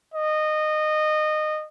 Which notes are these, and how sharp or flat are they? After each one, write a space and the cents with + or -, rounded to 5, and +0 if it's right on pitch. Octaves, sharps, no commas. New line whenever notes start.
D#5 -20